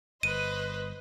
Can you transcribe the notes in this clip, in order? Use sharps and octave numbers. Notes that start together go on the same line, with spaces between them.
G1 B4 C5 D#5 D#7